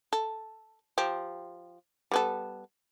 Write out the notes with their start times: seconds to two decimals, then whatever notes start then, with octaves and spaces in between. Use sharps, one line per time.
0.13 A4
0.98 F3 G4
2.11 G3 B3 A4